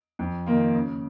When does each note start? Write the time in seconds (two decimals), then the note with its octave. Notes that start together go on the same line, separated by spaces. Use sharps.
0.19 F2
0.46 D#3 A#3 F4
0.74 C#3